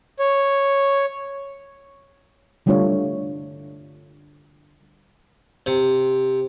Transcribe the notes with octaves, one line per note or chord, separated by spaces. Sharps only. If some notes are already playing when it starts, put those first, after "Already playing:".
C#5
D3 G3 A3 D4 F4 C#5
C3